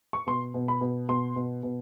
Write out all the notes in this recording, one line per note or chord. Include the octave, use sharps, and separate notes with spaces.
C#6
B2 C6
B2
B5
B2
B2 C6
B2
B2